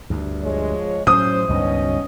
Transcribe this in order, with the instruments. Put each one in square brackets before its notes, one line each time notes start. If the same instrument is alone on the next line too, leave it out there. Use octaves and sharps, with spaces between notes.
[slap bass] D2 G2
[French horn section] F3 G#3 C#5
[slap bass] A2 F#3 [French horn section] C#4 C5 [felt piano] D#6
[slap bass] C#2 G2 D#3 [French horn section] B2 C#4 D#5